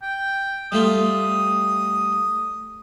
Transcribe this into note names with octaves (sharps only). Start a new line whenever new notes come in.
G5
G3 A3 F4 D#6